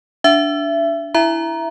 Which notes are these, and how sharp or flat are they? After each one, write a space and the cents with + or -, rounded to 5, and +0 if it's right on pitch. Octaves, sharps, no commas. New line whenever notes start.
D4 -10 E5 +25
E4 +0 E5 +15 A#5 +10